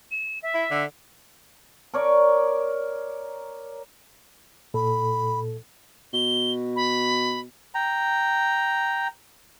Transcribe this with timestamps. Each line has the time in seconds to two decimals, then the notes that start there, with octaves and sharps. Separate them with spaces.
0.11 E7
0.43 E5
0.54 E4
0.71 D3
1.94 A#4 C#5 D5
4.74 A#2 A4 B5
6.14 B2 G7
6.76 B5
7.75 G5 A#5